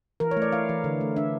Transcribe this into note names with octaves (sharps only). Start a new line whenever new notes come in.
E3 A#4
C#5
A3
D5
E4 F5
E3
D3
A3
D4 E5